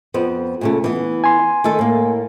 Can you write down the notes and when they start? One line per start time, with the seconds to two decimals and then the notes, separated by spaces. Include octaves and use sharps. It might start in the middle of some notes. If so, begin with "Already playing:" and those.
0.14 F2 B3 C4
0.61 A#2 C#3 A3
0.84 E3 B3
1.24 G#5 C6
1.64 D#3 A3 A4
1.79 A2 A#3